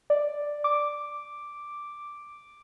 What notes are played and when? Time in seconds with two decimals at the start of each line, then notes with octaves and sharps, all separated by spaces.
0.10 D5
0.64 D6